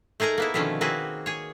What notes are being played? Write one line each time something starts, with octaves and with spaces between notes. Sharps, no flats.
A3 D#4 G#4 A#4 A#5
A#3 B3 E4
B2 D3 D#3 F3 A3 C#4
A#3 C4 F#4 G#4 B4
G#4 C#5